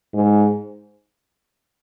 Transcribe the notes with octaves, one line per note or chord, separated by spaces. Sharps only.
G#2